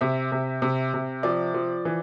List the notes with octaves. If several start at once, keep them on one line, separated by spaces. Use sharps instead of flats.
C3 E5
C3
C3
C3
F3 D5
F3
E3